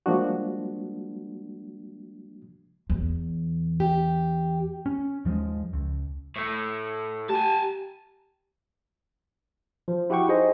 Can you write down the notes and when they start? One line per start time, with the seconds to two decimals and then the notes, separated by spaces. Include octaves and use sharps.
0.06 F3 G3 G#3 A#3 D4 F#4
2.90 E2
3.80 G4
4.86 C#4
5.25 D#2 F3 F#3 G#3
5.73 C#2
6.36 A2 A3
7.29 G4 G#5 A5
9.88 F3
10.10 E4 F#4 G4 F#5 G5 C#6
10.28 D#4 G#4 C5 D#5